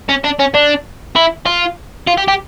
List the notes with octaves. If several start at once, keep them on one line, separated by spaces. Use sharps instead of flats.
C#4
D4
C#4
D4
E4
F4
F4
G4
G4